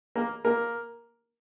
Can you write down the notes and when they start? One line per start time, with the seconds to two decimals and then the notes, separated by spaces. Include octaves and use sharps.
0.16 A#3 A#4
0.45 A#3 A#4